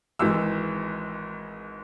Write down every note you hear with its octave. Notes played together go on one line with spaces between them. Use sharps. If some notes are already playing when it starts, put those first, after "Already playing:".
G#1 G#2 E3 E6